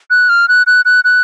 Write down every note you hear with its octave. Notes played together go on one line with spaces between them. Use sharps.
F#6
F6
F#6
F#6
F#6
F#6